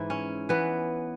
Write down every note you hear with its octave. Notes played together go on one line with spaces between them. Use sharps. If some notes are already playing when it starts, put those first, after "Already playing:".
Already playing: G#2 E3 E4
C#4
E3 B3